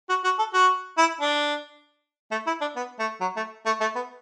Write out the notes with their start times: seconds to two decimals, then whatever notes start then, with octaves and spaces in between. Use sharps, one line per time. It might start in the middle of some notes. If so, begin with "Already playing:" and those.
0.09 F#4
0.24 F#4
0.39 A4
0.53 F#4
0.98 E4
1.21 D4
2.31 A3
2.47 E4
2.61 D4
2.76 B3
2.99 A3
3.21 F#3
3.37 A3
3.66 A3
3.81 A3
3.95 B3